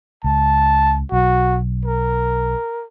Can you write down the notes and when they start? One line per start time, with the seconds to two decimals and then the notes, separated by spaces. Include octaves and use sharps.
0.24 C#2 A5
1.12 B1 F#4
1.85 A#4